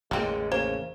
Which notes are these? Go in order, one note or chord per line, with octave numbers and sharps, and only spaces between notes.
A1 E2 D3 G#3 A#3 C4
C#3 A#3 C5